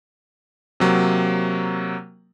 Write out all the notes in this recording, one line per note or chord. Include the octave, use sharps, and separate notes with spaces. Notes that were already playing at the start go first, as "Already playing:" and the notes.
C3 F#3 A#3